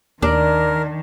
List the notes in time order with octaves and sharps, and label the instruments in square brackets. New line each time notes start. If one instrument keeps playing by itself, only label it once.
[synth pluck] D#2 [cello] D#3 [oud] D4 [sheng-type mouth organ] A#4